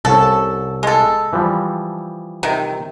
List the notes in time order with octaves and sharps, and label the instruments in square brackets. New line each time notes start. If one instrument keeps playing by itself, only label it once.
[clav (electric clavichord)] C2 C#4 [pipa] A4
[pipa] G#3 A4
[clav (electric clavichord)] E3 F3 G3
[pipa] C3 D#3